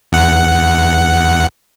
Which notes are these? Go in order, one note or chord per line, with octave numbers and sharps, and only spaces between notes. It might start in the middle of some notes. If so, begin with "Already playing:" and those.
E2 F#5